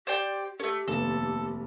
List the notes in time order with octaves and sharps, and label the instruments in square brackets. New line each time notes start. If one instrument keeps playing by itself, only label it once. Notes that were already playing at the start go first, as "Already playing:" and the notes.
[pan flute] G4 [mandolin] C5 D5 G5
[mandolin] A3 C#4 [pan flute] G4 [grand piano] A4
[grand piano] F1 D#2 B3 [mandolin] A4